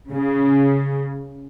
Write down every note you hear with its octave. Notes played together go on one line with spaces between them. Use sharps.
C#3